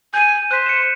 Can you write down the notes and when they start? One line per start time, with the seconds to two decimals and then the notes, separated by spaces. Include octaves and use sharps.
0.14 G#5 G6 D#7
0.51 C5 F#6 B6
0.66 C#7 E7